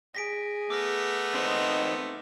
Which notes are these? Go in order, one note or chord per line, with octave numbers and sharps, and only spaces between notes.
G#4 A#6 B6 D7
A3 B3 D6 F6 A#6
C4 D#4 C5 D#5